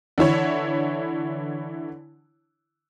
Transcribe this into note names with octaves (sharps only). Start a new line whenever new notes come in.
D3 E3 E4 C#5